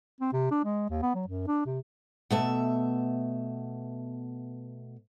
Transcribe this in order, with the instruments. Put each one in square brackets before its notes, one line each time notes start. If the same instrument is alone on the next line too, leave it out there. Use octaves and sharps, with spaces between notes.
[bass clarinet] C4
C3
D4
G#3
D#2
B3
F#3
F#2
D4
C3
[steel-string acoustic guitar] B2 A3 E5